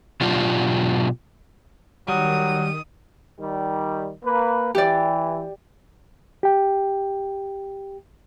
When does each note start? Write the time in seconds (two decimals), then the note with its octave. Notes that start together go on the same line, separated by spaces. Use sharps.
0.21 B2 F#3 D4 F4 G4
2.08 D#3 F#3 G3 D#6
3.41 D#3 G3
4.23 A#3 B4
4.75 E3 G4 D5
6.43 G4 G5